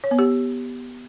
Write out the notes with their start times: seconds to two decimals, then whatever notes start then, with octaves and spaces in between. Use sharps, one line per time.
0.04 C#5
0.11 B3
0.19 G4